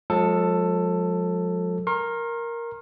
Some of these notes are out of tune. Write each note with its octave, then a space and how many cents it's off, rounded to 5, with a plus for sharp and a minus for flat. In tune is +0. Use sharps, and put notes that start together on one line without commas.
F3 +45 G#3 +0 A4 +10
A#4 +0 C6 +45